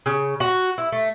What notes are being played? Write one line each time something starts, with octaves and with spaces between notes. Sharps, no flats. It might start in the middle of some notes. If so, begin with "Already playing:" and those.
C#3
F#4
E4
A3